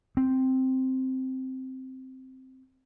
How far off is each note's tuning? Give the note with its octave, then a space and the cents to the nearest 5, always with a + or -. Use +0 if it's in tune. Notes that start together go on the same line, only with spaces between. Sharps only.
C4 +0